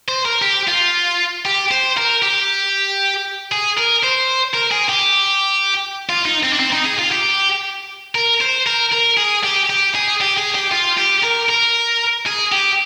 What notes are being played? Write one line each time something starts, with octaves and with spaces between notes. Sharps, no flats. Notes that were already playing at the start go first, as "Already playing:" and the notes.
C5
A#4
G4
F4
G4
C5
A#4
G4
G#4
A#4
C5
A#4
G#4
G4
F4
D#4
C4
D4
C4
D#4
G#4
F4
G4
A#4
C5
A#4
A#4
G#4
G4
G4
G#4
G4
G#4
G4
F4
G4
A#4
A#4
G#4
G4